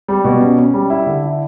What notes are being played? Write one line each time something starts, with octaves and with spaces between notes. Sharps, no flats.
G3
B2
C#4
C#4
G3
E4
D3
E4